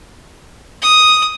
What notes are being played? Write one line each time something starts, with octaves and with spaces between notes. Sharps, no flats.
D#6